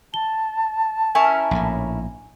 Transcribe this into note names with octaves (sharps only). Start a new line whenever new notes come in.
A5 G7
C#4 E4 A#4 G#5
A#1 A2